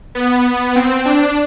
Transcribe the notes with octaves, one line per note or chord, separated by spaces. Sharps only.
B3
C4
D4